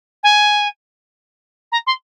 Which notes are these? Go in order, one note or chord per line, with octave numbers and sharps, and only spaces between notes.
G#5
A#5
C6